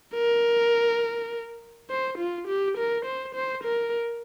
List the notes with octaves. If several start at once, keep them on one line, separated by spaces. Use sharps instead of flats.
A#4
C5
F4
G4
A#4
C5
C5
A#4